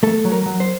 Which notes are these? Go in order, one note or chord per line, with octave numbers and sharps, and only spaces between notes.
A3 A4
F#3
A#4
F#3
C5